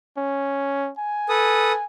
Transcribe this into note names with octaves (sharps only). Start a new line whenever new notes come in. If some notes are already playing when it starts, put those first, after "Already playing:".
C#4
G#5
A4 B4 D#6